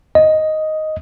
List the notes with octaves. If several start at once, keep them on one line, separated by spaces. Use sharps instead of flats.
D#5